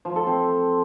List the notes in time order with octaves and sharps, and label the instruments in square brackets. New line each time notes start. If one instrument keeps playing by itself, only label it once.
[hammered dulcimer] F3
A4
C4